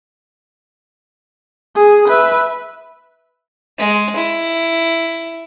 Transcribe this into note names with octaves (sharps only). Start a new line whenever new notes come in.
G#4
B4 E5
G#3
E4